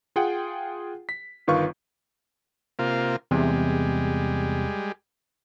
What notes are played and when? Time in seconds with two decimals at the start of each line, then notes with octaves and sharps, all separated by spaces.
0.16 F4 G#4 F#5 G5
1.09 B6
1.47 G1 D#3 F4 B4 F5 C#6
2.79 C3 A#3 F4
3.31 E2 C3 G3 G#3